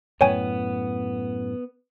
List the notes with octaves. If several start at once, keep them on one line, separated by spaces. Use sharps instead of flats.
F#2 A2 B3 C#5 G5 G#5